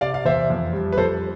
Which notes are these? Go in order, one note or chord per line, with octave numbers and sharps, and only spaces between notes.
C3 D5 F5
F5
E2 C5 E5
F2
G3
B4
F2 A4 C5